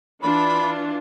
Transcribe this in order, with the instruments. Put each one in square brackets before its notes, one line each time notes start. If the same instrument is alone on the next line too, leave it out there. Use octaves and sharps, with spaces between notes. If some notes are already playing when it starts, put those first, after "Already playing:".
[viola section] E3 D4 F4 [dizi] B5